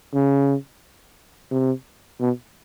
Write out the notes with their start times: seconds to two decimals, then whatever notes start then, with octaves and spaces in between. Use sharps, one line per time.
0.13 C#3
1.51 C3
2.20 B2